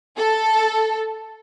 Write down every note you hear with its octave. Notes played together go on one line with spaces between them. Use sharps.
A4